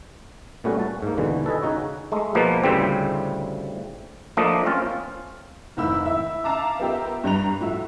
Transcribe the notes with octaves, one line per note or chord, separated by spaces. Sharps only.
A#2 G3 A3 B3 C#4 F#4
A5
G#2 A#3
D#2 B2 D3 E3
A4 B4 D#5 G#5
C#3 D#4 F#4 C#5
G#3 A3
B2 F3 A#3 B3
D2 A2 C#3 G3 C4
F3 A3 A#3 D4 D#5
C4 C#4 F4
F1 G#2 D#3 E4 B5 E6
E4 E5
E5 F5 A5 A#5 D6
B3 F4 G4 A#4 E5
G2 G3 A#5 F7
A2 F3 F#4 E5